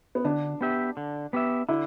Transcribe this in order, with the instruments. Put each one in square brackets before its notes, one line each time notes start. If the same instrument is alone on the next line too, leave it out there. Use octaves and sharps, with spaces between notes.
[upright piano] B3
[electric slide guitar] D3 [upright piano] D4
[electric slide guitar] B3 G4 E5
D3
B3 G4 E5
[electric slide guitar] D3 [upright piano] E4